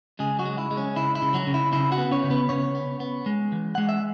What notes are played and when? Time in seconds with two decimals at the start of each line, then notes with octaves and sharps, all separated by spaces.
0.19 C#3 G#3 G#4
0.39 F#3 F#4
0.45 G#3
0.58 E4
0.71 G#3
0.77 C#4
0.96 C#3 E4
1.15 E4
1.22 C#3
1.34 F#3 F#4
1.47 C#3
1.54 E4
1.73 C#3 E4
1.92 F#4 F#5
1.98 B3
2.11 C#4 C#5
2.24 C#3
2.30 B3 B4
2.49 C#3 C#4 C#5
2.75 B3
3.00 B3
3.26 G#3
3.52 E3
3.75 G#3 F#5
3.89 E5